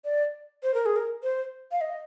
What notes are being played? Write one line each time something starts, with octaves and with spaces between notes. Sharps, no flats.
D5
C5
A#4
G#4
A#4
C5
F5
D#5